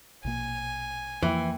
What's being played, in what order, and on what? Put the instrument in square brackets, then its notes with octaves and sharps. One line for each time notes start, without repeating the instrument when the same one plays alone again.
[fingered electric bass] A#1 B2 A#3 [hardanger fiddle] G#5
[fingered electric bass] F2 F3 [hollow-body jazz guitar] E3 [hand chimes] A#3 G5